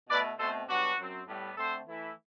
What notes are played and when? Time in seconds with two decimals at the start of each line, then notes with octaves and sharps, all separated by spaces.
0.09 B2 A3 E4 B4 D5
0.39 B2 A3 C4 A4 C5
0.69 G2 F#3 B3 D4 F#4
0.99 F#2 F#3 C4
1.28 A2 G3 B3
1.57 D3 A3 C4 A4 C5
1.87 E3 A3 E4